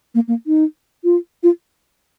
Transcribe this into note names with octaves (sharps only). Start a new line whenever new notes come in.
A#3
A#3
D#4
F4
F4